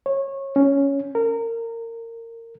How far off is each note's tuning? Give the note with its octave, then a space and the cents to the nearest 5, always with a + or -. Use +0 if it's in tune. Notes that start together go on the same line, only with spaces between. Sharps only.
C#5 -25
C#4 +5
A#4 -25